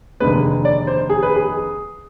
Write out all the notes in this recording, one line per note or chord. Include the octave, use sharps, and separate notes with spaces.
F1 D#2 D3 G#3 B4
D5
C5
G#4
B4
G#4